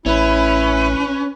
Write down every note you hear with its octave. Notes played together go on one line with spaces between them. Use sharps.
A1 C#4 E4 B4